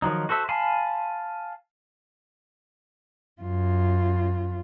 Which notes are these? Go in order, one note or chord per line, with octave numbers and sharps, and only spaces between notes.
D#3 F3 F#3 D#4
F#4 A4 C5 E5
F5 G#5 A5 B5 C6
F#2 F4